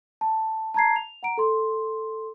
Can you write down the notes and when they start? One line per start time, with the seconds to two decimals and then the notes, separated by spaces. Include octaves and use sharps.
0.21 A5
0.74 A5 A#5 G#6 C7
0.96 F7
1.23 F#5 A#5 D7
1.38 A4 C6